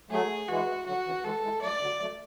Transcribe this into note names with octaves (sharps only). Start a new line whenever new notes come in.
F#3 A3 G#4
E3 G#3 F#4
D3 F#3 F#4
C#3 E3
E3 G#3 A4
E3 G#3
F#3 A3 D5
D3 F#3
F#3 A3